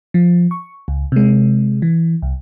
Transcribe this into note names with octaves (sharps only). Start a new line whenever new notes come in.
F3
C#6
C#2
C3 G#3
E3
C2